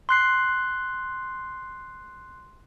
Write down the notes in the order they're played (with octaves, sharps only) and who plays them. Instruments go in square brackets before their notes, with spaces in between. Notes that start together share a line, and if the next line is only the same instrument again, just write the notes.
[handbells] C6 F#6 C7